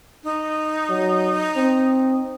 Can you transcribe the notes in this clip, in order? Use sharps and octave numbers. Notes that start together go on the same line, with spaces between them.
D#4
F#3
C4